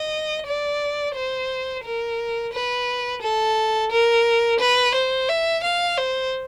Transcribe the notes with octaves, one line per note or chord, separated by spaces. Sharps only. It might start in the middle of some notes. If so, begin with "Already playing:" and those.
Already playing: D#5
D5
C5
A#4
B4
A4
A#4
B4
C5
E5
F5
C5